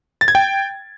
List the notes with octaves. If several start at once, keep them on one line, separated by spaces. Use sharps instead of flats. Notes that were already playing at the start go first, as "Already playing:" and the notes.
A6
G#6
G5